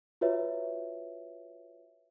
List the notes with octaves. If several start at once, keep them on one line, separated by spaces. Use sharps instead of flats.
F4 F#4 B4 C#5 E5